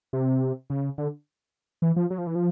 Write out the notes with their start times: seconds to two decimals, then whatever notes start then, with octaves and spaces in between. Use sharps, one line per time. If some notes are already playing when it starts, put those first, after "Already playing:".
0.13 C3
0.70 C#3
0.98 D3
1.82 E3
1.96 F3
2.10 F#3
2.18 F3
2.27 E3
2.35 F3